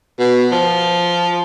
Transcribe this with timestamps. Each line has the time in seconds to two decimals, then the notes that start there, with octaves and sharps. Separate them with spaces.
0.19 B2
0.52 F3